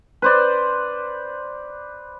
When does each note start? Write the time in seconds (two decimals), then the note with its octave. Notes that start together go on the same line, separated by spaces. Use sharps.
0.22 B4 C5 D5